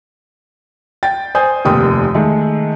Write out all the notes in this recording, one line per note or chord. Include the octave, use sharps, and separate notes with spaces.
G5 A6
C5 G#5 D#6 G6
F1 D#2 G4 G5 D#6
D#3 G#3 A3